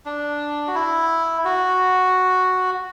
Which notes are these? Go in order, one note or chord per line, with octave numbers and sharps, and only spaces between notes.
D4
F#4
E4
F#4